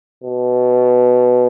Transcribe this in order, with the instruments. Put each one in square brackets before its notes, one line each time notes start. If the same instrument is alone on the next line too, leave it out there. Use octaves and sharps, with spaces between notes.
[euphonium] B2